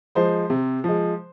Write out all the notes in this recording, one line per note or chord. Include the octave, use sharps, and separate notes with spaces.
F3 G#3 C5
C3
F3 G#3